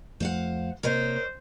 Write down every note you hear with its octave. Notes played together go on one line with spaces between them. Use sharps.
F2 F3 A3 C5 F5 F#5
C3 A#3 A#4 C5 C#5 D#5